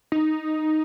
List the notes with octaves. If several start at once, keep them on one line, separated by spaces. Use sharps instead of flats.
D#4